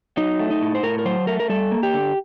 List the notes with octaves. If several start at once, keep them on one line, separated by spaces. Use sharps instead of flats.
F#3 D#4
A3
D#4
A2
C5
A2 A#4
A#4
F#3 C5
A3 A#4
A#4
G3 A4
A#3
G4
D3